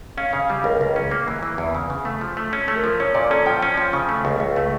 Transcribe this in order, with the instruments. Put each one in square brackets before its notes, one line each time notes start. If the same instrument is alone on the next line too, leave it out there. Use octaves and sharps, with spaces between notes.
[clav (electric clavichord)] C#4 [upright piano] F5
[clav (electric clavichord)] C#3 [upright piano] F5
[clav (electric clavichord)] G3
[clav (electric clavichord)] C#2 [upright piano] A#4
[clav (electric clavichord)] C#2
C#4
A#3
E3
E3
E2
C#3
C#3
A3
F3
A3
C#4
A3
[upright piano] A#4
[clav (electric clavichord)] F3
[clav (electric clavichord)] C#4 [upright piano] C#5
[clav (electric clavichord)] A#2 [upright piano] D5
[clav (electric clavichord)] C#4 [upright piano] A4
[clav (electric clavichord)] F3 [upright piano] G5
[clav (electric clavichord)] C#4
F3
[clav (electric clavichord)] C#3 [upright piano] C#6
[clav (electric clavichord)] A3
[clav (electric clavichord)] C#2 [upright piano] C#6
[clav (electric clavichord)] C#2
A3